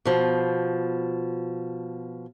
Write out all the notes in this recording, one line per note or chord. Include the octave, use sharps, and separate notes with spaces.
B2 F3